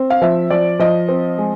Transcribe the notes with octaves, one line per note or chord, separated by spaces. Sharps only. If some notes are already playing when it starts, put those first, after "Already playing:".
Already playing: C4
F5
F3 E5
F3 D5
F3 D#5
C4
G#3